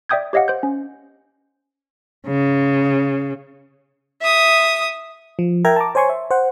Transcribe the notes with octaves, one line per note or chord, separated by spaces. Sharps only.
D5 E5 G5 D#6 G6 G#6
G4 C#5 D#5 F5 F#5
C5 G6
C#4
C#3
E5 D#6
F3
A#4 E5 G5 A#5 G#6
A5 A#5 D6
C5 C#5 G#5 C6 C#6
E5
C5 F#5